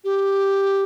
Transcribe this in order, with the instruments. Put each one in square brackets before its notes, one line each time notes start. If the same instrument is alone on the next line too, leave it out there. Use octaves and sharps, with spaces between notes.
[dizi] G4